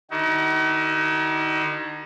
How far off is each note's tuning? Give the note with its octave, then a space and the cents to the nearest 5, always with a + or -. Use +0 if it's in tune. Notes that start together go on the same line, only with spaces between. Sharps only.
D#3 -40 D#4 +40 F#4 +45